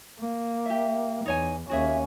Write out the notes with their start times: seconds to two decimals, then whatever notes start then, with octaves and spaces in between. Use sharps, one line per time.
0.19 A#3
0.66 G4 E5
1.26 E2 D#4 C#5 G#5
1.69 D#2 C#4 F#4 G#4 E5